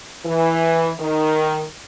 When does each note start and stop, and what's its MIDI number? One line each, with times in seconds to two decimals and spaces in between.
0.25 0.91 52
0.99 1.63 51